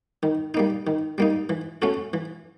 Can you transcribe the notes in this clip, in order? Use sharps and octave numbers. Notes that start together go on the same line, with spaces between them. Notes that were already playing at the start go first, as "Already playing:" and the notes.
D#3
G3 A#3 D#4
D#3
G3 A#3 D#4
E3
A3 C#4 F#4 A4
E3